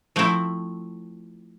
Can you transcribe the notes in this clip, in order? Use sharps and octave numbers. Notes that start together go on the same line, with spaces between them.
F3 A3 C4 E4